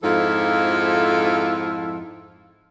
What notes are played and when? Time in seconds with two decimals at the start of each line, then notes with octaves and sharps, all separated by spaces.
0.03 F2 G#2 F3 E4 F4 A4